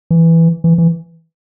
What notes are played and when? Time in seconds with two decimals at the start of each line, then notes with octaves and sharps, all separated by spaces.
0.11 E3
0.64 E3
0.78 E3